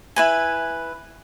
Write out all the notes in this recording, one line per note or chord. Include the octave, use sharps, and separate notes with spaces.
E4 B4 G#5